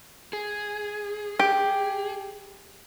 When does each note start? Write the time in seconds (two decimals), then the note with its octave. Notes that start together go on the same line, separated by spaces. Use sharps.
0.33 G#4
1.39 G4